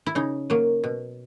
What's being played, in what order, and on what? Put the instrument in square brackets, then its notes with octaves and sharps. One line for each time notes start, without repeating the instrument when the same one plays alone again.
[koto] E4
C#3 D#4
F#3 A#3
B2